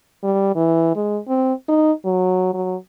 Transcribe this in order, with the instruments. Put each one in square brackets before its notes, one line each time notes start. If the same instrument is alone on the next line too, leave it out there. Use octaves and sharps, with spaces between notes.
[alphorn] G3
E3
G#3
C4
D#4
F#3
F#3